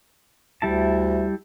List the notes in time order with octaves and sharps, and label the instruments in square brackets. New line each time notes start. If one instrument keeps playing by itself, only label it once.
[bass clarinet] D2 [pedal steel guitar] G3 E4 A5